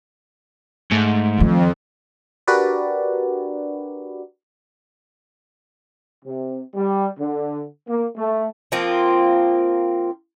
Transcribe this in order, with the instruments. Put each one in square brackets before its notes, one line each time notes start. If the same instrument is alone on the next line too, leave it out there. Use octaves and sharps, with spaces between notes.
[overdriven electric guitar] G#2 [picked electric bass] A3
[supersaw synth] F2 [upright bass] D#3 F3
[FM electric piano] D4 F#4 G4 A#4 B4 D5
[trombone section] C3
G3
D3
A#3
A3
[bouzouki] F3 A#3 C4 F4